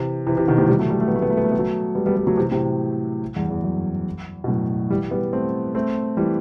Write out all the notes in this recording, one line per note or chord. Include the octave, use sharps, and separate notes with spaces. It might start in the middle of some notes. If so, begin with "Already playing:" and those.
Already playing: C3 E3
C3 E3
C3 E3
B2 D#3
A2 C3
E3 G3
F#3 A3
E3 G3
A3
B3
A3
B3
A3
B3
A3
B3
F#3 A3
G3 B3
G3 B3
G3 B3
F#3 A3
C3 E3
A2 C3
E2 G2
E2
F#2
B2
F#2 A2
E3 G3
G3 B3
A3 C4
A3 C4
E3 G3